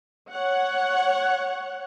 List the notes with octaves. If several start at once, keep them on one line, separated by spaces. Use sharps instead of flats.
C#5 F#5